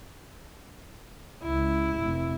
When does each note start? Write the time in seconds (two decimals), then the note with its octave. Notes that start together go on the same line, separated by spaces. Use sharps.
1.43 C#2 E4
1.97 F1